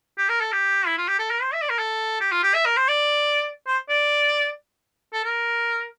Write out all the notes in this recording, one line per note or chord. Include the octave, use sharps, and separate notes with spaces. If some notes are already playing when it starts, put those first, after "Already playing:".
G4
A#4
A4
G4
E4
F4
G4
A4
A#4
C5
E5
D5
A#4
A4
G4
F4
G4
E5
A#4
C5
D5
C5
D5
A4
A#4